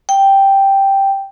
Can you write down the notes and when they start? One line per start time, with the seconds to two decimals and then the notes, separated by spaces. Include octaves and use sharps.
0.09 G5